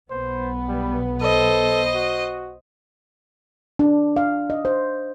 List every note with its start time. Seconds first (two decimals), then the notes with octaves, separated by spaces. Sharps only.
0.11 B1 B3 C5
0.68 G3
1.22 A4 C5 D#5
1.94 F#4
3.79 D4
4.16 F5
4.50 D#5
4.65 C5